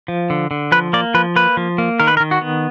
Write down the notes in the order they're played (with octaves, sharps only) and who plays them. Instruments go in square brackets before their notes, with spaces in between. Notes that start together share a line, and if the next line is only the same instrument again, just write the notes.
[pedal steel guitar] F3
D3
D3
F3 B4
A#3 D5
F3 B4
A#3 B4
F3
A#3
D#3 A#4
B4
A#4
D#3
F#4
B3